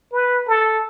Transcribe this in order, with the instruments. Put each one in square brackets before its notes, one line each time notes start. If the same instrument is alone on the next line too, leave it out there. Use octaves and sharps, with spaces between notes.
[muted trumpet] B4
A4